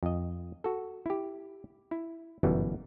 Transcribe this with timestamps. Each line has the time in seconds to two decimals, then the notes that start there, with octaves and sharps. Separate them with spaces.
0.03 F2 D#5
0.64 F#4 A4
1.06 E4 G4
1.91 E4
2.43 G1 F#2 B2 E3 G3